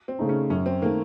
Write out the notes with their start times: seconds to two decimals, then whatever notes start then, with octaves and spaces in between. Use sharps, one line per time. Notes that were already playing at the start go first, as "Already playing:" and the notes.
0.08 C4
0.19 C#3 A3 D#4
0.29 C#4
0.50 F#2 C#4
0.66 C4
0.82 D#3 A3 A#3